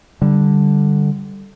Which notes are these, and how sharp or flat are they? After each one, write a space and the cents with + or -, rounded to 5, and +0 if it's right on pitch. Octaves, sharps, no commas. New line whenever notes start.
D3 +0 G3 +0